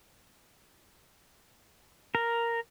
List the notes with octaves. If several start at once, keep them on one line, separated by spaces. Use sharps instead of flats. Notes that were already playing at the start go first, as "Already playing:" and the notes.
A#4